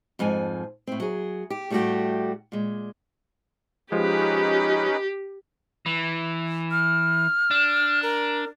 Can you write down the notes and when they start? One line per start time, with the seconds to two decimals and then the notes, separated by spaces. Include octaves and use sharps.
0.19 F2 G#2 F3 G#5
0.87 A2 C4
1.00 F#3 G#4
1.50 G4
1.70 A2 G3 A3 B3 F#4 G4
2.52 A#2 G#3
3.92 F3 G#3 C#4 D#4 G4 B4
5.86 E3
6.71 F6
7.51 D4
8.03 A#4